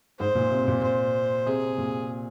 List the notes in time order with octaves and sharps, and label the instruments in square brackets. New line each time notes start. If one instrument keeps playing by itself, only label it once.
[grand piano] G#2 [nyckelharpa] C5
[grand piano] A#2
C3
A#2
[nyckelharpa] C5
[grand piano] C3 [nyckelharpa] G#4
[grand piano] A#2